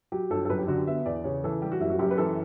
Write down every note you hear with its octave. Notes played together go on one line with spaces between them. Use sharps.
F#3 G4
G1 A4
A4
F#2 B4
G4
D3 F#4
G4
B3 E5
E2 D5
C#3 C#5
E3 A4
G3 G4
F#4
F#1 E4
F#4
F#2 G4
B4
E3 A4